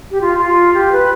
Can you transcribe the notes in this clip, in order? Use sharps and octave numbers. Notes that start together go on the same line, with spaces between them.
G4
F4
F4
G4
B4